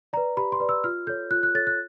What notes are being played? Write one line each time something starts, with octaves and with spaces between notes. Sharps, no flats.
B4 D5 A#5
G4 B5
C6
B4 D5
E6
F4 F6
A4 C#5 G6
F4 F#6
F#6
A4 C#5 A6
F#6